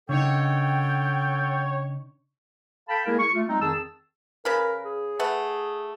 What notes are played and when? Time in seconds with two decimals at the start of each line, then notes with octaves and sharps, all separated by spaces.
0.09 C#3 D4 D#4 A4 C#5 F#5 G5
2.88 A4 F5 G5 A5 B5
3.06 G#3 A#3 E4 G#4 A#4
3.19 C#6
3.34 A3 F4
3.48 G3 G#3 C4 D#4
3.60 F2 D#3 G#4 A5 E6
4.45 C#3 A#4 B4
4.84 G#4
5.19 A3 B4 F#5